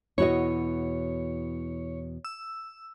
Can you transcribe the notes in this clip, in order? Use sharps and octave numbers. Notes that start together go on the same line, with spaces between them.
E2 B2 E4 F#4 C#5 D#5
E6